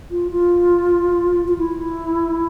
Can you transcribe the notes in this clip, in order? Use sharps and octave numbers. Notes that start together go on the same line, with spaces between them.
F4
F4
F4
E4